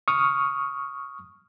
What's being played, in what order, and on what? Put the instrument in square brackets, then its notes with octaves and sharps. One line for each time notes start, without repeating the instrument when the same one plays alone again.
[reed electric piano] C#6 D#6 F6